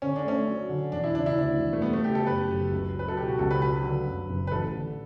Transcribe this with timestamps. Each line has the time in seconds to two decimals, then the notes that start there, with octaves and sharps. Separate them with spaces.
0.02 D3 C#4
0.16 D4
0.25 A3 C#4
0.48 F#3
0.69 D3
0.92 E1 D4
1.04 E4
1.15 C#3 D4
1.26 E4
1.38 D2 D4
1.59 E1
1.73 A3
1.82 G3 B3
1.93 A3
2.04 C#3 G4
2.15 A4
2.27 F#2 B4
2.49 F#1
2.71 C#2
2.95 F#3 B4
3.08 A4
3.17 B2 G4
3.28 F#4
3.39 C#2 A4
3.51 B4
3.62 F#3 B4
3.84 D3
4.06 F#2
4.29 F#1
4.47 B4
4.51 A1 A4
4.75 D3